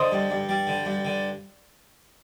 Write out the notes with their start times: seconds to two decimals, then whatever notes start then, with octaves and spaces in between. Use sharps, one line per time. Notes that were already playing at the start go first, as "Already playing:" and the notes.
Already playing: D3 C5 D#5
0.12 G2
0.30 G2
0.49 G3
0.67 D3
0.85 G2
1.05 D3